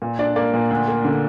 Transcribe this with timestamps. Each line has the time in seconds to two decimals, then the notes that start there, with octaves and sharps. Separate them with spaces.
0.02 A#2
0.19 D4 D5
0.36 A#3 D5
0.54 A#2
0.71 D2
0.88 A#3
1.05 D3